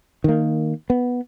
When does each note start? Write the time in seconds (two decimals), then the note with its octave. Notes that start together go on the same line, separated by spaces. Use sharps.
0.24 D#3 A#3
0.90 B3